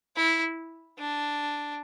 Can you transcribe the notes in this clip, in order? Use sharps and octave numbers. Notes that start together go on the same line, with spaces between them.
E4
D4